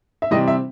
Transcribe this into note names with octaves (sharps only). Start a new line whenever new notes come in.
E5
C3 E3 G3 C4 D#5
E5